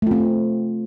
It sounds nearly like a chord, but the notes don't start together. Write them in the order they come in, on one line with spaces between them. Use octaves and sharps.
A3 F4 C4